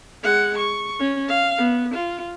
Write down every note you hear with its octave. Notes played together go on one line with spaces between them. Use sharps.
G#3 F#5
C#6
C#4
F5
B3
F4